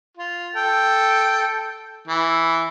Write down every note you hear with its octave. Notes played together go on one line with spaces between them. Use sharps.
F4
A4 G5
E3